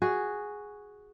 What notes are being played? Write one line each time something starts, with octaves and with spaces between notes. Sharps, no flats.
F#4 G#4